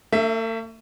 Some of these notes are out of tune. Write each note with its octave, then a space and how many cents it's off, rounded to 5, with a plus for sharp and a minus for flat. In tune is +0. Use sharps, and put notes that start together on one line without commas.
A3 +45 E5 +5